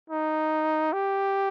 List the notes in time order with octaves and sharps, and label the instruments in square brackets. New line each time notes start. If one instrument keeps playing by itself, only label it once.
[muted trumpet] D#4
G4